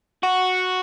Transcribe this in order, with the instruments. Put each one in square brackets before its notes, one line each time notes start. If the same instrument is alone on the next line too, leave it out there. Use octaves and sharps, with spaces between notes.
[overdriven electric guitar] F#4